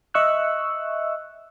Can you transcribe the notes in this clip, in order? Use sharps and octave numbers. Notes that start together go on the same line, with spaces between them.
D#5 E5 C#6 E6 F#6